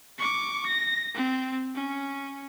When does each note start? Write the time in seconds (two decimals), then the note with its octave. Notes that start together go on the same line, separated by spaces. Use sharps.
0.18 C#6 D6
0.66 A#6
1.15 C4
1.75 C#4